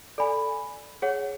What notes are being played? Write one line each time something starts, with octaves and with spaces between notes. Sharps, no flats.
A4 D5 G#5 B5
G#4 C#5 F#5